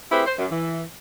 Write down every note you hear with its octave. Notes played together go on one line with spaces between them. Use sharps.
A3 C4 E4 G4 G#4 B4
C5
F#2
E3